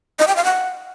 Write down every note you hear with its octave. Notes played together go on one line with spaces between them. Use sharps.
D#5
G5
F5
F#5